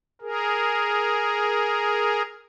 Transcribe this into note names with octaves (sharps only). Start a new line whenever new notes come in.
G#4 A#4